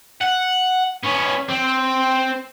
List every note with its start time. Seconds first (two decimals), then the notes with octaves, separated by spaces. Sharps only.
0.21 F#5
1.03 B3 C#4
1.49 C4